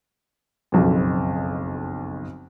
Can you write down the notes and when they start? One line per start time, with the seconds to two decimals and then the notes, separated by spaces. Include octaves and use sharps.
0.72 F#1 B1 F2